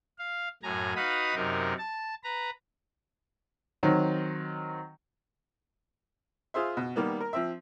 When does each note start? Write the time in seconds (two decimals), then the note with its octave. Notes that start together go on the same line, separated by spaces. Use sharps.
0.18 F5
0.63 F#2 A2 G#5 A#5
0.96 D#4 F#4 B4 F5 B5 D#6
1.35 F#2 C3 D#4 A#4
1.78 A5
2.24 B4 A#5
3.83 D#3 F#3 C4
6.54 F4 G#4 C5 E5
6.77 B2
6.96 D#3 G3 A#3 B3
7.20 A#4
7.33 F3 C4 E5